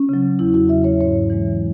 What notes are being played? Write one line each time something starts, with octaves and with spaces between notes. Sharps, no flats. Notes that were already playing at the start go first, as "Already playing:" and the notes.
Already playing: C#4
C#3 F#3
E2 E4
F#4
C#3 F#3 E5
C#5
G#2 C#5
E3 G#3